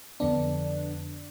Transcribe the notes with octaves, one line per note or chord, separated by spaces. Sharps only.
F2 D3 B3 D4